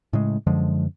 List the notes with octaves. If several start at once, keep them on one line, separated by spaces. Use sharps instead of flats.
A2 C#3 G#3
F#2 D3 F3 G#3